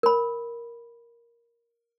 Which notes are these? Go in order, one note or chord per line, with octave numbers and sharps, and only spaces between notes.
A#4 B5